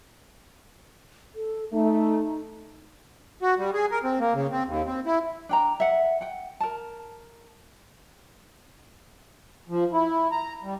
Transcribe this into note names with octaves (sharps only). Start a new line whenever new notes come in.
A4
A3 D#4
F#4
G3
G#4
A#4
C4
A#3
C#3
C4
D#2
C4
E4
D4 G5 A#5
E5 F#5
F#5 G5
A#4 A5
F3
E4
A#5
G3